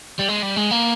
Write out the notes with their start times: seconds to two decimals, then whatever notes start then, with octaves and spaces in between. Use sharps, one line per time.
0.19 G3
0.28 G#3
0.42 G3
0.56 G#3
0.71 A#3